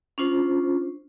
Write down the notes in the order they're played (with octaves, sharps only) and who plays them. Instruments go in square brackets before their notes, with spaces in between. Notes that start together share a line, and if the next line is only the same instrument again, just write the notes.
[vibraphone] C#4 D4 F4 C5